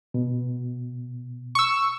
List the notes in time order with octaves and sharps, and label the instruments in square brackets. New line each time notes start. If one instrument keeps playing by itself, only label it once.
[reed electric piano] B2
[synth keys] C#6 E6